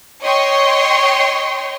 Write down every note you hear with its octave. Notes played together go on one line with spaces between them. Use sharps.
C#5 D#5 G5 C6 C#6